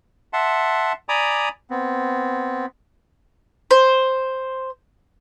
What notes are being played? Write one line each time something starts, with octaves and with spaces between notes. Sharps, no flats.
E5 F#5 A5 C6
D5 G#5 A#5 B5 D6 D#6
B3 C4
C5